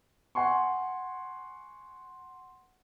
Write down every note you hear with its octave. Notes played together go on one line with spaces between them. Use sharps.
F#5 G#5 C6 C#6